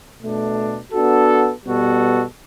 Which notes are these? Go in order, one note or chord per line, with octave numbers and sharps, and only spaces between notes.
B2 A3 D4
B3 D4 F#4 A4
B2 G3 B3 F#4 A4